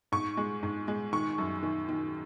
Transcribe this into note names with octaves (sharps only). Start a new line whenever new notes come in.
G#2 C#6
G#3
G#2
G#3
D#3 C#6
F#2
D#3
D#3